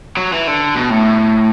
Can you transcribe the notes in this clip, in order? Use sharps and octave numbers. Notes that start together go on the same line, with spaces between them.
F#3
E3
D3
B2
A2